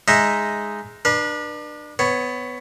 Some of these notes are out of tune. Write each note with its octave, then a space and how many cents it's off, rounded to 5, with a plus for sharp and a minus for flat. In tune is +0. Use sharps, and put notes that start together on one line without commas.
G#3 +0 D#4 +0 E5 +0
D4 +30 B4 -35
B3 +15 C#5 +0